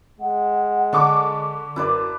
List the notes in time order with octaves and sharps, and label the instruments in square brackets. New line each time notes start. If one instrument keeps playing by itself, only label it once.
[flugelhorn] G#3 [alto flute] F#5
[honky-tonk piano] D3 C#6 D6 [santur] D4
[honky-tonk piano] F#2 [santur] E4 B4 D5 [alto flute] A#4